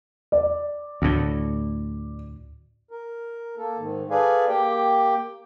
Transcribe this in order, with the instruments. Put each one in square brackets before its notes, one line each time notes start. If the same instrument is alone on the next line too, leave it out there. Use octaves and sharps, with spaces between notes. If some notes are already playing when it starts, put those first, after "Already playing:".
[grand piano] D5
[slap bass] D2 A2
[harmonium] A#4
A#3 A4
G#2 D#3
G#4 A4 B4 D5 F5 G#5
A#3 G4 G5